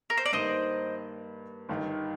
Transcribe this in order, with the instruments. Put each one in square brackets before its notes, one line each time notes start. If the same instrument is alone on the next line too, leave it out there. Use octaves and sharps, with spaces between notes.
[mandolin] A#4
C5
D5
[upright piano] G2 D#3 A#3 D#4 [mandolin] C5 D#5
[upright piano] G1 G2 D#3